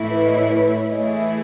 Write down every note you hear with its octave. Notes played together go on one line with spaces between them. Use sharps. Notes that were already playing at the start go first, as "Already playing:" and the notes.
Already playing: A2 E3 A3 E4
B4
D#5
C#5
B4
C#5
C#5
E3 A3 E4 G#4 D#5
E5
E5